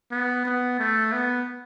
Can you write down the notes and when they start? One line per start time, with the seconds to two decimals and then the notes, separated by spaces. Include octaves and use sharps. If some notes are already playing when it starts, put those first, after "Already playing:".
0.11 B3
0.45 B3
0.79 A3
1.12 B3